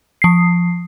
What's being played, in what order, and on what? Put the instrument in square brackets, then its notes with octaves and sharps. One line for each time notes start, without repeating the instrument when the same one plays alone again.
[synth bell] F3 C7